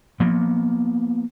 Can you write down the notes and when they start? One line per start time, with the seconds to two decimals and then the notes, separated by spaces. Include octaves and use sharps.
0.20 F3 A#3 B3